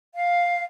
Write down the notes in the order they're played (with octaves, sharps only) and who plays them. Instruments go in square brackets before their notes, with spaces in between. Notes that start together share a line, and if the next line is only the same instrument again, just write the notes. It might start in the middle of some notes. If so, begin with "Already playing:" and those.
[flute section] F5